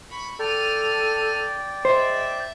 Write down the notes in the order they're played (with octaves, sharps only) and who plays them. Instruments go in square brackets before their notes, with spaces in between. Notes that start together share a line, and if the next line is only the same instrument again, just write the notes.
[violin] B5 C#6
[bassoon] A4 [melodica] D5 G5 [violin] F6 D#7
[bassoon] G#3 [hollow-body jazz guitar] C5 [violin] E5